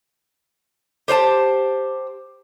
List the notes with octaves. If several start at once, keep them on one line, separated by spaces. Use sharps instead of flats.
G4 C5 D5 A5